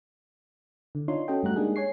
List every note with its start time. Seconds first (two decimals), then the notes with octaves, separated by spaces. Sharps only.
0.95 D3
1.08 D4 D#4 F4 C#5 C6
1.28 C#4 F#4 A4 D#5 G5
1.43 G2 G3 A3 F#4 A#5 F#6
1.56 G#3 A#3 D4 D#4 G4 G#4
1.76 C#5 G#5 C#6 C7